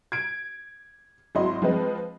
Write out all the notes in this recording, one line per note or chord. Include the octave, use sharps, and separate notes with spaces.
G#6 D7
G#1 F#3 E4 D#5 C6
F3 G#3 C4 B4 D#5